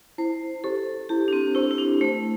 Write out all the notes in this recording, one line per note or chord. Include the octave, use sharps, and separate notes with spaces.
E4 C5
G4 A4 C5
E4 G4
D4
C4
E4 G4 C5
E4
D4
A3 C5